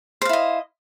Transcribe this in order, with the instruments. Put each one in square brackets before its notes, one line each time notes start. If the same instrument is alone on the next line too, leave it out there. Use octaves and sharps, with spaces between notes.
[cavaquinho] C5
F5
E4
D#5